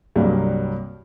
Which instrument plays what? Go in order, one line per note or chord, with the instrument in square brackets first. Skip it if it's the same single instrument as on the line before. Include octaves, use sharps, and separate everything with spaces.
[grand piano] C2 G2 F#3 A#3